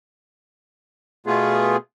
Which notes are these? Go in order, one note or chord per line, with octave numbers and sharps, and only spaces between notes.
B2 A3 B3 F4 G#4